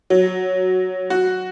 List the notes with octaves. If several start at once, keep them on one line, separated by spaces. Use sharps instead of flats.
F#3
F#4